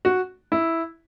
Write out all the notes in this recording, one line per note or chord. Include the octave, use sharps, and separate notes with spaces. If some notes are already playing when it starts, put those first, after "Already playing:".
F#4
E4